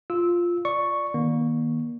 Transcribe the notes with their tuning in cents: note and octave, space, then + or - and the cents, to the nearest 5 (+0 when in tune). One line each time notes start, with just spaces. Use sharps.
F4 +0 E6 -15
D5 +0 C#6 +0
D#3 +10 A#3 +30